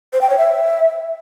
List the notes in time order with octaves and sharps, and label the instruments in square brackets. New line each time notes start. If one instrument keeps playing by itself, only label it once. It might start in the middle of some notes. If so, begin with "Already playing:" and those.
[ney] C5
G5
C#5
E5